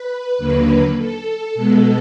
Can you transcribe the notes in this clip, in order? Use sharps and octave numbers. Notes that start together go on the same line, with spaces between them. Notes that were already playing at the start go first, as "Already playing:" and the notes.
Already playing: B4
D#2 D3 F#3 A#3
A4
B2 G#3 B3